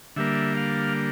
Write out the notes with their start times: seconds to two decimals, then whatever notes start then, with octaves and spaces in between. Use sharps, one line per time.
0.16 D3 G3 A#3 E5
0.57 F5